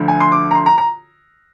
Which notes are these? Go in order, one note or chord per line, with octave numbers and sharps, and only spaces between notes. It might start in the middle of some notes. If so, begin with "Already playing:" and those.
Already playing: D2 D3 F3
G#5
C6
D6
A#5
C6
A#5
A#5